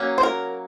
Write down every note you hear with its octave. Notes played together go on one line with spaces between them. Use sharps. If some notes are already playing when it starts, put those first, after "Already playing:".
Already playing: F#3 A#3 C#4
C5
A#4